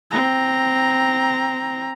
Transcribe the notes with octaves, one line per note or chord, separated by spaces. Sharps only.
C4 A#5